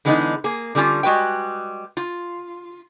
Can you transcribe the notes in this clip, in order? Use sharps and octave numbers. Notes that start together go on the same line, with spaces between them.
D3 E3 G#3 B3 C#4 D#4
A#3 G#4
D3 G3 C#4 D#4 F4
G3 G#3 F#4 B4 G5
F4